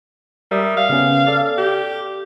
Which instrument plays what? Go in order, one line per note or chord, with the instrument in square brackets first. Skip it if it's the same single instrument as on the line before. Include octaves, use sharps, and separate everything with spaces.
[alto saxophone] G3 [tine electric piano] A#4 E5 D#6
[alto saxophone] F5
[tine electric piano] C#3 B3 C#4
A4 D5
[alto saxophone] G4